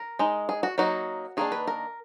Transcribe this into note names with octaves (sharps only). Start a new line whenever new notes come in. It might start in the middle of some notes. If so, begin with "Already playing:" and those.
Already playing: A#4
G#3 D#4
G#4
F#4
F#3 A#3 D#4 F#4
D#3 A#3 D4 G#4
B4
A#4